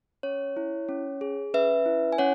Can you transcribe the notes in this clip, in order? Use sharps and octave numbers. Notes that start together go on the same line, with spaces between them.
C#4 C#5
E4
C#4
G#4
C#4 B4 E5
E4
G#5
C#4 C#5 F#5